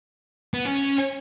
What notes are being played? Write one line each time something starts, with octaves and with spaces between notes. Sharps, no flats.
B3
C#4